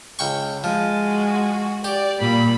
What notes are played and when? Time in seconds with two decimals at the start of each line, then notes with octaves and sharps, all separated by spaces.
0.19 C#2 G5 C#6
0.64 F3 G#3
1.04 F#4
1.84 G4 D5
2.21 A#2 G3 B5